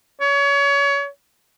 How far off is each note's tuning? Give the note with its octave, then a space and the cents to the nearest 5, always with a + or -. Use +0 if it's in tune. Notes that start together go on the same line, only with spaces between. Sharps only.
C#5 +30